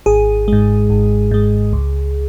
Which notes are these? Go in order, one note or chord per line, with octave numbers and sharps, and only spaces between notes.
G#1 G#4
G#2 G#3
G#1
G#2 G#3
C#2